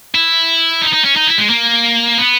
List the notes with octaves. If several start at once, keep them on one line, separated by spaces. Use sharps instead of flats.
E4
D#4
D#4
C#4
D#4
E4
G#3
A#3
B3